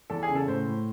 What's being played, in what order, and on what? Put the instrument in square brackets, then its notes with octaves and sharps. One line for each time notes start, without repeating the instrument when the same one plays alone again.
[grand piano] E2 A4
G#4
C#3
A4
A2 C5
A2